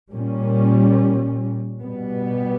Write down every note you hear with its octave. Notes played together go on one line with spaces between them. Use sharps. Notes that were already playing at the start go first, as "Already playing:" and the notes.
A#2 G3 C#4
B2 G3 B3